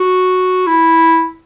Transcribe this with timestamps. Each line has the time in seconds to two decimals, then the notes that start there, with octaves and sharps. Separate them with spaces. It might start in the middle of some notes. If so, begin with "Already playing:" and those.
Already playing: F#4
0.67 E4